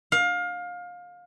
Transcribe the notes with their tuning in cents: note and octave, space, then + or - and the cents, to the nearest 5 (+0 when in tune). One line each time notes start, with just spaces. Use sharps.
F5 +25